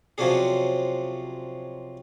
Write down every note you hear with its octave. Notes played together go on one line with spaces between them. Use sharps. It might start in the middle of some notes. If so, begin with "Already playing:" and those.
C3 F3 F#3 C#4 D4 G#4